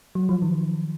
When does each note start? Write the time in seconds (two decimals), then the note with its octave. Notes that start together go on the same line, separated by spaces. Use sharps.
0.15 F#3
0.29 F3
0.42 D#3